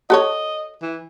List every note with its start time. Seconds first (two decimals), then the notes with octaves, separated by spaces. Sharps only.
0.10 F#4 A4 C#5 D#5
0.82 E3